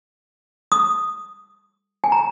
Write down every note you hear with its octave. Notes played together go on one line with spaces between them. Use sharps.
D#6
G#5
A#5